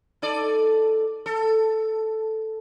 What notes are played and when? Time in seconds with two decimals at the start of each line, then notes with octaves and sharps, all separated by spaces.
0.22 D#4 A4 D5
1.26 A4